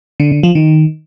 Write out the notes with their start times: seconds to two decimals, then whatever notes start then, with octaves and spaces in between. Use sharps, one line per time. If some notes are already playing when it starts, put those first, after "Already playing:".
0.20 D3
0.31 D3
0.43 F3
0.55 D#3